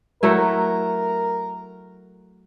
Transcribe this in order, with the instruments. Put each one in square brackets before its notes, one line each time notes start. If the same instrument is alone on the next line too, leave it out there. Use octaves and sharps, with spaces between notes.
[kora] F#3 A3 E4 [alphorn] A#4